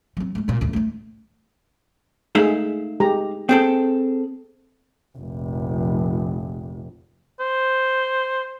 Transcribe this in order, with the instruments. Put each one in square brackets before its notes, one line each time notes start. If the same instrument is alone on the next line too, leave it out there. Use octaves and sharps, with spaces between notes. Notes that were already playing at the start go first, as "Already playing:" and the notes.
[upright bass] F#3 C4
G#3 A3
F1 A#2
A1 D2
A3 D#4
[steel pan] G#3 A3 G#4 [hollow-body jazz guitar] D#4 E5 F5
[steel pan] G#3 G4 A#5
[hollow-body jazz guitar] C4 G#4 A4 [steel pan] G5
[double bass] F1 A#1
[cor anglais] C5